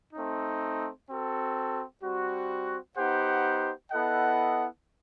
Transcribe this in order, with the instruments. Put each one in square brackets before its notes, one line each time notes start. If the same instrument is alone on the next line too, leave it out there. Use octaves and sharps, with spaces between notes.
[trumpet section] A3 C4 D#4
C4 F#4 A4
G3 C4 F#4
B3 D#4 G4 C5 F#5
B3 E4 A4 D#5 F#5